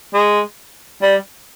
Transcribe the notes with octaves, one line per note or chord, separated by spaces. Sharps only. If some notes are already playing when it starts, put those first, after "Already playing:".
G#3
G3